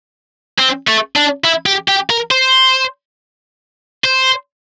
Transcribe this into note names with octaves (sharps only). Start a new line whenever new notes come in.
C4
A3
D4
E4
G4
G4
A#4
C5
C5